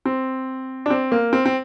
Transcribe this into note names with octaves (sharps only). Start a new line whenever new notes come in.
C4
D4
C4
A#3
C4
C4